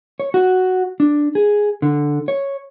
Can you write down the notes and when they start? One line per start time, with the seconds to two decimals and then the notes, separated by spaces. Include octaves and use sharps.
0.20 C#5
0.34 F#4
1.00 D4
1.35 G#4
1.82 D3
2.28 C#5